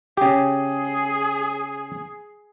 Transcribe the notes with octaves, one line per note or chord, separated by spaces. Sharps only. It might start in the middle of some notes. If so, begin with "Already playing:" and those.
C#3 G4 G#4